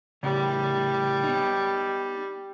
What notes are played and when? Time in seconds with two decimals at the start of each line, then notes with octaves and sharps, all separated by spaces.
0.23 A2 C#3 G3
1.24 B3 D#4